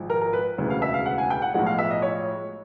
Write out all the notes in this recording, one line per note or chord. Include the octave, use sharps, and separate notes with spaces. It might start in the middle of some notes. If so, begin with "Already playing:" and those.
Already playing: G#1 G#2 F3
A#4
A#4
B4
E1 D2 C#3 E3
F5
E5
F5
F#5
G#5
G5
F#5
B1 A2 F3 G#3 F#5
F5
E5
D#5
C#5